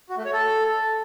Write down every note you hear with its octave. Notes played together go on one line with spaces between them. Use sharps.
F#4
A3
C#5
A4